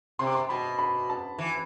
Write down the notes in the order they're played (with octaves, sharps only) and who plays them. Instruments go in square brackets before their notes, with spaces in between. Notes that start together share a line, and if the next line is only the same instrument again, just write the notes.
[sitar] C3 [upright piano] C6
[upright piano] D6
C6
[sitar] B2 [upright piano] B5
[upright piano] B5
A5
[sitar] E3